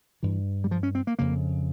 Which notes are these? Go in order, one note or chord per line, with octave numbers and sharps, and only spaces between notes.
G2 E3
G3
F3
C#4
C4
A#3
F2 C#3 A#3